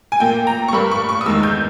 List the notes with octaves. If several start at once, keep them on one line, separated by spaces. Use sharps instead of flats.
G#5
A#2 A#3 G5
A#5
C#6
G2 G3 A#3 B5
C#6
C#6
D#6
E2 D#3 G#3 E6
G6